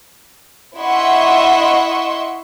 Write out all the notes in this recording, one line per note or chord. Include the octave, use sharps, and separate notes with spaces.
E4 D#5 E5 F#5 C6 C#6